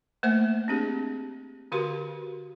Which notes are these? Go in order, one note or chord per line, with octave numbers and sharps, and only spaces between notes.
A3 A#3 C5 E5 F#5
C4 D4 G4 G#4
D3 F#4 G4 A#4 F5 C6